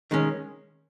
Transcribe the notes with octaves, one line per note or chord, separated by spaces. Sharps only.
D#3 G#3 C#4